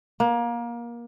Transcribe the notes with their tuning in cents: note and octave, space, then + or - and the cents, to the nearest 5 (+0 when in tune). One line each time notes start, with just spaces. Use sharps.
A#3 +25